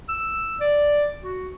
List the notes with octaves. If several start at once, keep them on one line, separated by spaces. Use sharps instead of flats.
E6
D5
F#4